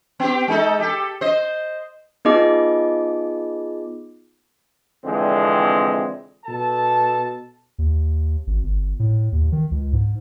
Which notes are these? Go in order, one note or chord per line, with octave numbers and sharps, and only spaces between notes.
B3 G4
G#3 D#4 A4
G4 A4
C5 D#5
B3 D#4 F4 G#4 D#5 D6
F2 D3 E3 G#3 C4
B2 A4 A5
D#2
G#1
G1
A2
D#2
D#3
C#2
G#2